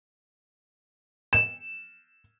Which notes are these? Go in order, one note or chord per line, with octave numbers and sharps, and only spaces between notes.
E7